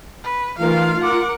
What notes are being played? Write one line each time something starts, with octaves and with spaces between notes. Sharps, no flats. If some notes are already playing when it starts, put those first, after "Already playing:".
B4
E3 A3 D#4 F4 A#4 F5
A#4 F#5 D6